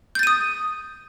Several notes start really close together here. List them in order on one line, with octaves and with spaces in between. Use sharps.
G6 A6 D#7 D#6